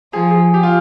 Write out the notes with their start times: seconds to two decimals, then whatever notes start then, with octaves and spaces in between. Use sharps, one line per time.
0.13 F3 G#4
0.31 G#4
0.54 G4
0.63 F4